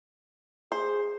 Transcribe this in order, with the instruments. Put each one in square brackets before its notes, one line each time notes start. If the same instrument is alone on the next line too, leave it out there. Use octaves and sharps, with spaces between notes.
[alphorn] G#4 [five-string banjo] C5